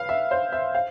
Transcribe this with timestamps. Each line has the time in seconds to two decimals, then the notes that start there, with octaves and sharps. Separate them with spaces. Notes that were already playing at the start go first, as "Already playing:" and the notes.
Already playing: B4 F5
0.09 E5
0.31 C5
0.52 E5
0.75 F5